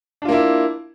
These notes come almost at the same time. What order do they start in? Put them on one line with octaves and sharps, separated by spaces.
D4 F4 A#3 E4